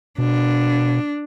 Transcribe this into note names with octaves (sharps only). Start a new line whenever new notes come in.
B2 D4